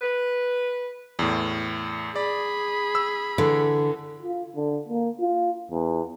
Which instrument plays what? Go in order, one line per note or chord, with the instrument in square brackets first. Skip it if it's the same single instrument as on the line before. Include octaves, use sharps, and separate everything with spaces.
[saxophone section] B4
[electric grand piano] E2 A2
[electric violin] G#4 B5 [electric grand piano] D5
[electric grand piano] E6
[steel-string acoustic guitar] D3 [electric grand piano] E3
[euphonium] F4
D3
A#3
F4
E2